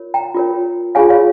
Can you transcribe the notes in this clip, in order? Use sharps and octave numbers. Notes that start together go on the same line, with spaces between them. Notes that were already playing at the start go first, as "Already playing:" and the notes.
Already playing: F4 A#4 C#5
G5 A#5
F4 A#4 C#5
F4 G#4 C#5 F5 G#5
C#5 F5